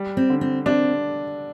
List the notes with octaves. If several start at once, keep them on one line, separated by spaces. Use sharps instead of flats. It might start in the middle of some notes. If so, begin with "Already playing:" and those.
Already playing: G3
C4
D3
C4
C4 D4